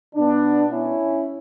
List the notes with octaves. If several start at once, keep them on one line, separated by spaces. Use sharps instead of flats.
B2 B3 D4
C#4 E4